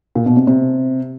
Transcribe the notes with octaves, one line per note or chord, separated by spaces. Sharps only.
A#2
B2
C3
C3